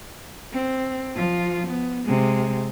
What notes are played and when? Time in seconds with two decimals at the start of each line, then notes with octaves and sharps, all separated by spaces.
0.53 C4
1.15 F3 F4
1.67 B3
2.06 C3 G#3